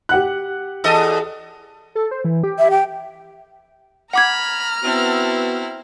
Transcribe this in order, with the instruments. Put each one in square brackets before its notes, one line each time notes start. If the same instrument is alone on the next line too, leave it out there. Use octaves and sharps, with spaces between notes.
[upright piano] G4 F#5 F#6
[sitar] E2 A4 D#5
[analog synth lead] A4
C5
E3
G4
[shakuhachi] E5
G5
[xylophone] F#5 D6 G#6 [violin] A#5 F6 [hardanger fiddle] B5
[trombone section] B3 F#4 [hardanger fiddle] C4 E4